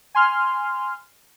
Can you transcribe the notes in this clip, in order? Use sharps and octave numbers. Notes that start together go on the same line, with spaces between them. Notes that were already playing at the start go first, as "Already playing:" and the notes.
G#5 C6 F6